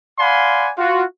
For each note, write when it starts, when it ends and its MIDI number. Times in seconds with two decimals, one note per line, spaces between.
0.19 0.69 74
0.19 0.69 77
0.19 0.69 78
0.19 0.69 80
0.19 0.69 83
0.19 0.69 84
0.78 1.02 65
0.78 1.02 66